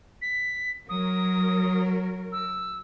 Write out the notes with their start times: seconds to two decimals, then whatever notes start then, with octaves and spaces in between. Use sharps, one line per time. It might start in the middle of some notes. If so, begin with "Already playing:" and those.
0.22 B6
0.89 F#3 A#4 D#6
2.32 E6